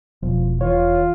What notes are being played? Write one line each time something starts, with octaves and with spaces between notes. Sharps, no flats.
E1 B2 F3
E3 F4 C#5